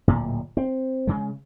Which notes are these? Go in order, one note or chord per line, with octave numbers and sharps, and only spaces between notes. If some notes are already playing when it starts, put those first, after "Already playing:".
D1 A#2
C4
C#3 G#3